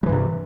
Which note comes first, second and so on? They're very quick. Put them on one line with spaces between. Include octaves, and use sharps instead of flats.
G3 E3 G2 C3